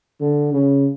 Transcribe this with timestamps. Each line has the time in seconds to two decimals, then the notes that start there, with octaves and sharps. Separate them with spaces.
0.21 D3
0.53 C#3